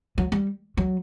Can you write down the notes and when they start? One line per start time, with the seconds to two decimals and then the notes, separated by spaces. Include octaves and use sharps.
0.18 F#3
0.32 G3
0.77 F#3